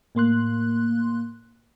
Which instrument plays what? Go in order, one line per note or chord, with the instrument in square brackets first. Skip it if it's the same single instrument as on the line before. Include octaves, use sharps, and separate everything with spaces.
[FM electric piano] A2 A#3 C6 F#6